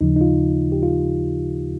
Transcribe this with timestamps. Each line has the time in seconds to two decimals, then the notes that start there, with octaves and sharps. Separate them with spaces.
0.01 D#2 C#3 F3 D#4
0.16 D#4
0.21 F4
0.72 G4
0.83 F4